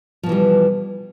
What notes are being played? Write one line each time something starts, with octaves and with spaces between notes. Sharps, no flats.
B2 E3 F3 G3